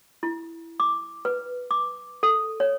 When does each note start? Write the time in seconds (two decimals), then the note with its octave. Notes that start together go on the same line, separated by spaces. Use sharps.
0.23 E4
0.80 D6
1.25 B4
1.71 D6
2.23 A4
2.60 C#5